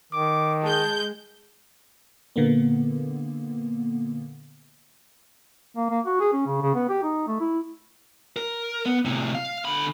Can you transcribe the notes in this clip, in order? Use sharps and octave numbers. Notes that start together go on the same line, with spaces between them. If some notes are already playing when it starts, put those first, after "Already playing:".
D#3 D6
G#3 A5 G6
A#2 D3 A#3 B3
A#3
A#3
F#4
G#4
C#4
C#3
C#3
B3
G4
D#4
A3
E4
A#4
B3
A2 C3
F5
D3 B5